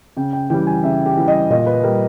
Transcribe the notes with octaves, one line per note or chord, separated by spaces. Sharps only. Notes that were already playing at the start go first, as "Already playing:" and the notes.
C#3 G5
G5
E3 G3 G5
G#5
C#3 E5
G4
E3 G3
D#5
A#2 D#5
B4
G3 A#4